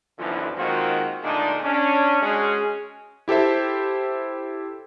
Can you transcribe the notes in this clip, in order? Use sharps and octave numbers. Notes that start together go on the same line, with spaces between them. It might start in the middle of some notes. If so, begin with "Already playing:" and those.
B1 F#2 D3 E3 F3
D#3 G#3 A#3 C4 F4 F#4
A#2 D3 G#3 A3 D4 D#4
C#4 D4
G#3 C#4 F#4 G#4
E4 G4 A4 C5 E5